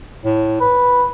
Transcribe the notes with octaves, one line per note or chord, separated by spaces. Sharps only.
A2
B4